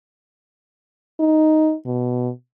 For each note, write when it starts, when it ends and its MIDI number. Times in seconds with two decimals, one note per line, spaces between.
1.20 1.74 63
1.86 2.30 47